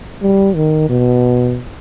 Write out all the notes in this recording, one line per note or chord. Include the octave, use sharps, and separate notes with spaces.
G3
D#3
B2